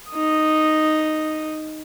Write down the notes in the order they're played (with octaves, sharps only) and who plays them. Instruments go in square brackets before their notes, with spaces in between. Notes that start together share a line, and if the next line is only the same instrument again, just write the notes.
[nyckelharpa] D#4 D#6